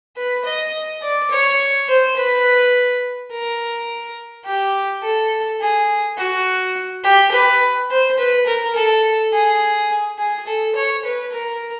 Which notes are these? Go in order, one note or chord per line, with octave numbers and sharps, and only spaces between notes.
B4
D#5
D5
C#5
C5
B4
A#4
G4
A4
G#4
F#4
G4
B4
C5
B4
A#4
A4
G#4
G#4
A4
C#5
B4
A#4